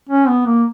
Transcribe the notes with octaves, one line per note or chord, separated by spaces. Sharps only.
C#4
B3
A#3